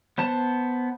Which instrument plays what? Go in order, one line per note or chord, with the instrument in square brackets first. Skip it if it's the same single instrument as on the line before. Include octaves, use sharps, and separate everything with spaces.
[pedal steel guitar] B3 C5 A5